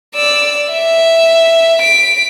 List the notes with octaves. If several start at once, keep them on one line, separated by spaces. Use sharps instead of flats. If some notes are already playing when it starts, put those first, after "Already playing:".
D5 E6
E5
B6 D7